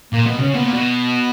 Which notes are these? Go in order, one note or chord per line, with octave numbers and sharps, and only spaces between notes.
A#2 A#3
B2 B3
C#3 C#4
A#2 B3
B2